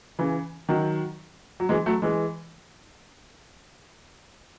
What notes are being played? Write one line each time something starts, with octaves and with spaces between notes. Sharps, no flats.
C#3 E3
D#3 F#3
F#3
E3 G#3
F#3 A3
E3 G#3